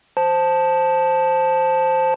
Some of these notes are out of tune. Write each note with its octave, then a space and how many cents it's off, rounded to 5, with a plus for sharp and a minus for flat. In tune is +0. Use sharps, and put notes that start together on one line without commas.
C5 +0 A5 +0